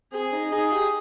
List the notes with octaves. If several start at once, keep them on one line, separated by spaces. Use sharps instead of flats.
C4 G#4
D#4
D#4 G#4
G4